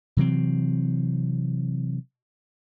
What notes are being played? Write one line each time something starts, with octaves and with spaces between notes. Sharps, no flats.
C3 E3 F#3 C4